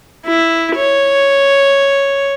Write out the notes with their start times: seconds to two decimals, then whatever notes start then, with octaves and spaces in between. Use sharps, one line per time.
0.26 E4
0.76 C#5